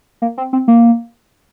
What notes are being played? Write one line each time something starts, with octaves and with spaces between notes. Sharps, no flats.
A#3
C4
C4
A#3